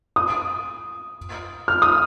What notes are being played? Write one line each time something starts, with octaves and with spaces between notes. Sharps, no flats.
D#6
F6
D#6